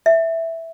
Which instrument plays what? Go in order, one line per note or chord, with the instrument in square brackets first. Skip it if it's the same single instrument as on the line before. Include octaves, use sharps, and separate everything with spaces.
[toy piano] E5